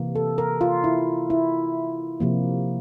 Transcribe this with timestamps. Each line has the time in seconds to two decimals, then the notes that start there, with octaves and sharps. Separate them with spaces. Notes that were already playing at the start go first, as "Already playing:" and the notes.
Already playing: C3 E3 A#3
0.15 A4
0.38 A#4
0.61 F4
0.84 E4
1.30 E4
2.20 C3 F3 A#3